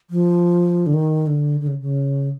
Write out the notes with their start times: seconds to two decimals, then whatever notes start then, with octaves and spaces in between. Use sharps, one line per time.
0.10 F3
0.86 D3
0.94 D#3
1.27 D3
1.60 D3
1.67 C#3
1.81 C#3